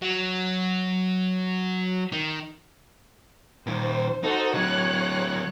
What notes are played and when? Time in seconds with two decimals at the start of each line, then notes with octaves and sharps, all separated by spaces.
0.02 F#3
2.12 D#3
3.67 A#2 D#3 C5
4.23 D#4 F#4 A4 C5
4.54 D3 F#3 C#5 F#6